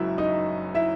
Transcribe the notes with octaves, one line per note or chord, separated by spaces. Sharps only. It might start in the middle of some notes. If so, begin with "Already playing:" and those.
Already playing: F#1 F#2 G#3 E4 F#4 E5
D#4 D#5
E4 E5